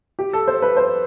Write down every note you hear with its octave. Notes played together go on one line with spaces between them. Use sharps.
G4
A4
C5
B4
C5